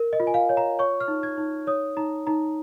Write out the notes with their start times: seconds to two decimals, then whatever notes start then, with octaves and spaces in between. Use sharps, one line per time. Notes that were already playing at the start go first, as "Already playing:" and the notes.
Already playing: A#4
0.13 D#5
0.20 F4
0.27 G#5
0.34 F5
0.49 C#5
0.57 A#5
0.79 C#5 C#6
1.00 F6
1.08 D#4
1.23 G#6
1.38 D#4
1.67 C#5 D#6
1.97 D#4 A#5
2.27 D#4 A#5